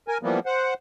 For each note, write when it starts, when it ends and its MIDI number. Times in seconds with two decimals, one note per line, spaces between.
0.08 0.18 70
0.08 0.18 80
0.23 0.40 52
0.23 0.40 53
0.23 0.40 55
0.23 0.40 58
0.23 0.40 59
0.46 0.74 72
0.46 0.74 78